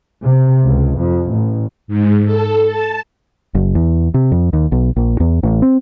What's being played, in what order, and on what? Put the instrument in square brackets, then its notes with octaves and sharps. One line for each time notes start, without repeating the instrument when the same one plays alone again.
[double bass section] C3
C#2
F2
A1
[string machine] G#2
A4
A5
[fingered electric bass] F#1
E2
C3
F2
D#2
B1
A#1
E2
A1
C4